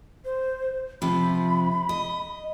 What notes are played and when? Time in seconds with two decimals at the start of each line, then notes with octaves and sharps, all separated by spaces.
0.25 C5
1.02 C3 F3 B5
1.89 D#5